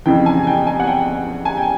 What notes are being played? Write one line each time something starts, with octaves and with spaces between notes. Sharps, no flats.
F2 C#3 E3 G5
G#5
G5
G#5
F#5
G5
G#5
G5